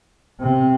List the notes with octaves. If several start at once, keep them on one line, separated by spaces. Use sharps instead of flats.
C3